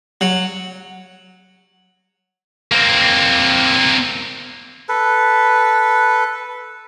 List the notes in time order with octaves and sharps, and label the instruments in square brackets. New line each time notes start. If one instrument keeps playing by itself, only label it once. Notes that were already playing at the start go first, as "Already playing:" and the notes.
[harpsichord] F#3
[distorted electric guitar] A#3 C4
[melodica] A4 B4